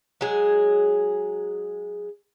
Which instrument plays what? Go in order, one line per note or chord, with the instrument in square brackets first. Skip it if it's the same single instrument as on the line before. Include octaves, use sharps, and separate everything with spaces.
[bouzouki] F#3 G#3 G#4